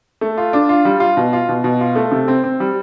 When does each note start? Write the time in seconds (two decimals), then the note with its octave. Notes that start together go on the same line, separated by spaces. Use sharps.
0.21 A3
0.38 F4
0.53 D4
0.69 F4
0.85 G3
1.00 F4
1.17 B2
1.33 F4
1.49 B2
1.64 B2
1.81 F4
1.96 A3
2.12 C3
2.28 C4
2.44 C4
2.60 G3